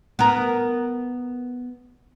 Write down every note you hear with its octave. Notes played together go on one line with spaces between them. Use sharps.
B3 A#4